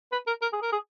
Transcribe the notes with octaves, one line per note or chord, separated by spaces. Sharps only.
B4
A#4
A#4
G#4
A#4
G#4